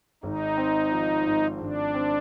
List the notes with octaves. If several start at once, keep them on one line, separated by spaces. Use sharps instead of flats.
G#1 D#4
C4
F3
G#2
G#1 D4
C4